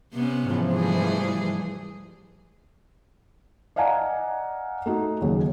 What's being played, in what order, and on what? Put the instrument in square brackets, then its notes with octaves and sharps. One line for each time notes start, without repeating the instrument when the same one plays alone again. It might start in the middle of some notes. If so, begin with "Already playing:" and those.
[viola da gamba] C3 B3 C#4
[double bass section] G#2 E3 F3
[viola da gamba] G3 A3 G#4
[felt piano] D5 D#5 F5 F#5 G#5 A#5
A3 D#4 F#4
D#2 C#3 F#3